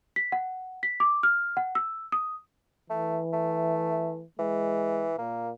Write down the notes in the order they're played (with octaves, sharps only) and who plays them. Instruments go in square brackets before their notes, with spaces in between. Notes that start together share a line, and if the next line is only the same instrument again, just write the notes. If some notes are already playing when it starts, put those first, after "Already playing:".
[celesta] B6
F#5
B6
D6
F6
F#5
E6
D#6
[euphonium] E3 [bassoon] A3
[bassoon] A3
[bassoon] E3 [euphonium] G#3
[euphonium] A#2 [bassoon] A#3